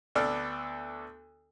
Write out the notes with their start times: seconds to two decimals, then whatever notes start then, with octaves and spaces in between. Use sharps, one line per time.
0.15 D2 B3 D4 A4 D5 F6